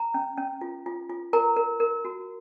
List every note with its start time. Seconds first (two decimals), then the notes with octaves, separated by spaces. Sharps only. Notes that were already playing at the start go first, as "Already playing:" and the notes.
Already playing: A#5
0.14 C#4
0.37 C#4
0.61 F4
0.86 F4
1.10 F4
1.33 A#4 A#5
1.56 A#4
1.80 A#4
2.05 F#4